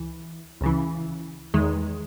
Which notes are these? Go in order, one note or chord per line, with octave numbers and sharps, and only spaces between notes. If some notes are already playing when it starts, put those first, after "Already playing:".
Already playing: C#2 E3
C#2 C#3 E3
E2 D#3 G#3